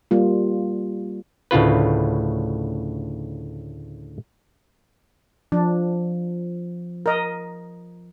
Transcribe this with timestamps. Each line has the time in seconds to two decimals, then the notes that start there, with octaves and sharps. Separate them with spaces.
0.11 G3 A#3 F4
1.51 D2 A2 C#3 F4 B4
5.52 F3 D4
7.06 A#4 D#5